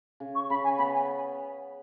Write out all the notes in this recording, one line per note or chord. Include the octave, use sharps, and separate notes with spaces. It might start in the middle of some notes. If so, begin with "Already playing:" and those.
C#3
C#6
C#3 B5
G#5
B3 B5
G#5